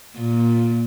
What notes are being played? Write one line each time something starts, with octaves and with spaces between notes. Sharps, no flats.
A#2